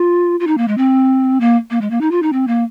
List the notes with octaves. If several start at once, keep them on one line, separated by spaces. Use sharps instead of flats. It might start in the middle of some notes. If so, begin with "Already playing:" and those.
Already playing: F4
F4
D#4
A#3
G#3
C4
A#3
A#3
G#3
A#3
D#4
F4
D#4
C4
A#3